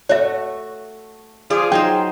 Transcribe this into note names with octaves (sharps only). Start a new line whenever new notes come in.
A3 F#4 C#5 E5
F3 F4 G#4 D5
F#3 D#4 C5 G5